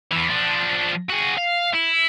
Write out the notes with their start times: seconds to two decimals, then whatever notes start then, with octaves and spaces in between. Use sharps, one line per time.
0.12 E2 E3
0.29 F3 D4
1.09 F#4 G#4
1.37 F5
1.73 E4